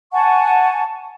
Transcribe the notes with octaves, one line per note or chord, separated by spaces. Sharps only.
F#5 G#5 A5 C#6